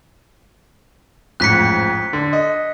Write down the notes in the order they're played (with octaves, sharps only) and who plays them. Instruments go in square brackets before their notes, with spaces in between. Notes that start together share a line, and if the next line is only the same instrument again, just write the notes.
[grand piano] A1 F2 G#2 [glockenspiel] F#6 B6 C#7
[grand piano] D3
D#5